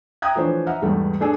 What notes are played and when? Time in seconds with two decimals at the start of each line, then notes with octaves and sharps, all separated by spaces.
0.22 E5 G5 A#5 D#6 F#6 G#6
0.35 E3 F3 A3 D4 C5 C#5
0.67 D#5 E5 F#5 A#5 F6
0.82 E2 G#2 G3 A3 B3
1.20 A3 D4 G#4 A4